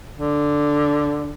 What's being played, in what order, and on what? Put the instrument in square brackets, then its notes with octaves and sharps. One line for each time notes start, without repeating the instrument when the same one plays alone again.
[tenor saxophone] D3